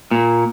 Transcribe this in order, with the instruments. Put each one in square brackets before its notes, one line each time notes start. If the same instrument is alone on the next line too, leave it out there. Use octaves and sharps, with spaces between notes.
[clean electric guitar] A#2